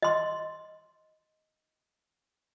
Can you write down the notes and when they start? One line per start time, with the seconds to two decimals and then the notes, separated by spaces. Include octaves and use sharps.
0.03 D#5 C6